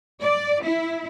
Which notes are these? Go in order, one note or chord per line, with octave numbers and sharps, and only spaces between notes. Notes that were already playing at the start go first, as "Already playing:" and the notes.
D5
E4